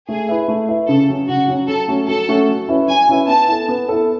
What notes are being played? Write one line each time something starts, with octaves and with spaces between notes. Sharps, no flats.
A3 G#4
E4 B4 E5
A3
E4 B4 E5
C#3 A4
F#3 C#4
C#3 F#4
F#3 C#4
F#3 A4
A3 C#4 F#4
F#3 A4
A3 C#4 F#4
F#3
C#4 E4 B4 E5
F#3 G#5
C#4 E4 B4 E5
B3 A5
E4 A4
B3
E4 A4